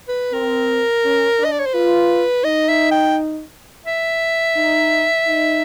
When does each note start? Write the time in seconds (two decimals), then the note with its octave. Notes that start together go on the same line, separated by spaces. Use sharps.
0.08 B4
0.33 C4 A#4
1.04 C#4
1.39 D4
1.45 D#5
1.52 D5
1.59 C#5
1.66 C5
1.74 F4 B4
2.44 D#4 D#5
2.68 E5
2.91 G5
3.86 E5
4.56 D#4
5.27 D#4